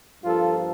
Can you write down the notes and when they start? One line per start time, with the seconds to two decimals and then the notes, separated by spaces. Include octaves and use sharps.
0.24 G2 F3 A#3 F4 A4